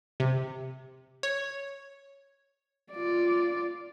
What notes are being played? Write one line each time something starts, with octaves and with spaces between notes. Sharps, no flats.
C3
C#5
F4 D5